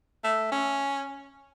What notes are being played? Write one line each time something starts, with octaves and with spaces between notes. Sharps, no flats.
A3
C#4